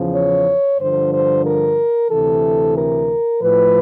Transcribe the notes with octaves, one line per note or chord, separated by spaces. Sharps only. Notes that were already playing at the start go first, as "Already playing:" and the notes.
Already playing: E2 C#3 F3
C#5
G2 D3 F3 C5
C5
A#4
D2 C3 E3 A4
A#4
A2 F3 B4